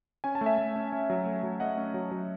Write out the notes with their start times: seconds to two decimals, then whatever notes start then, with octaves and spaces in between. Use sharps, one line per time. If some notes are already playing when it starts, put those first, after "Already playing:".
0.24 C#4 G#5
0.35 A5
0.41 A3
0.46 E5 G#5
0.58 A3
0.76 C#4
0.92 C#4
1.10 F#3
1.26 A3
1.44 F#3
1.60 A3 D#5 F#5
1.77 C#4
1.94 F#3
2.11 F#3